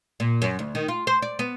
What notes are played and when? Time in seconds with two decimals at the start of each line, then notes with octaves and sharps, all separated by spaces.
0.20 A#2
0.42 F#2
0.59 D2
0.75 D#3
0.88 F4
1.07 C5
1.22 D5
1.39 B3